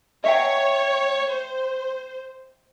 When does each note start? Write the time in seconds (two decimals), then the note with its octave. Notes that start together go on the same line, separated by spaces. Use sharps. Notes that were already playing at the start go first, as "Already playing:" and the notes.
0.24 C#5 D#5 E5 G5
1.31 C5